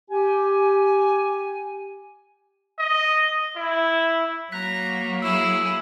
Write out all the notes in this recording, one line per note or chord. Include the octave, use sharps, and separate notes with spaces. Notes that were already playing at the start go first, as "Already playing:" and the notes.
G4 G#5
D#5
E4
F#3 A#3 A#5 F#6 B6
E4 G#4 E6